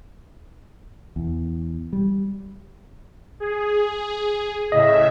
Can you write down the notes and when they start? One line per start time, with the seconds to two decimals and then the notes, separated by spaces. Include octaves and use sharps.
1.16 E2
1.93 G3
3.40 G#4
4.72 A2 C#3 D#5 E5